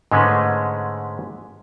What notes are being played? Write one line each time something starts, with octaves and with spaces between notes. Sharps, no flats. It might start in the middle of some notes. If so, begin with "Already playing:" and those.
G#2 D3 G#3 A3 C#4 B4